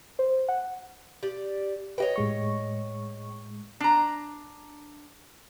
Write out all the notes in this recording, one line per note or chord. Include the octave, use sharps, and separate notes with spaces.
C5
F#5
G4 D5
G4 B4 C#5 D#5 G5
A2 G#3 C#6
D4 A#5